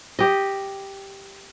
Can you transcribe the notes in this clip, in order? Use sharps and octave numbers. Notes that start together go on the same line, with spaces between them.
G4 D#5